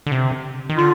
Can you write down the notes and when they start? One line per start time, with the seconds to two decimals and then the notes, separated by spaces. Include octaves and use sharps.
0.07 D3
0.12 C3
0.70 D#3
0.78 D3 F4